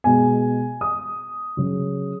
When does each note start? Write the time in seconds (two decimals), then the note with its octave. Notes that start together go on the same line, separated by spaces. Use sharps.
0.04 B2 G#3 B3 G#5
0.81 D#6
1.57 C#3 F#3